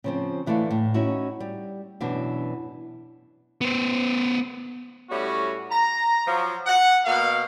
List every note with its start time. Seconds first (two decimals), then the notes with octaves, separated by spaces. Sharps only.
0.04 C#3 F3 C4
0.46 D3 E3 A3 A4 F5
0.71 A2
0.94 C#4 D#4 E4 F#4
1.40 G3
2.01 F#2 B2 E3 D4
3.61 B3 C5
5.10 A2 G3 C#4 F#4
5.71 A#5
6.27 F3 F#3
6.67 F#5
7.05 B2 A#3 F5